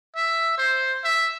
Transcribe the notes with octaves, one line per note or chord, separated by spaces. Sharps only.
E5
C5
E5